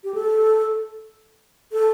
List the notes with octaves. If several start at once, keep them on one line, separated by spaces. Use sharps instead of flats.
G4
A4
A4